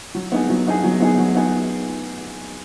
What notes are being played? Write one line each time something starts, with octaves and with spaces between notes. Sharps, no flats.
F#3
B3 D#4 G#4
F#3
B3 D#4 G#4
F#3
B3 D#4 G#4
F#3
B3 D#4 G#4